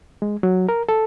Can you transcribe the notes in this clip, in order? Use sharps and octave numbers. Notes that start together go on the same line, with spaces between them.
G#3
F#3
A#4
A4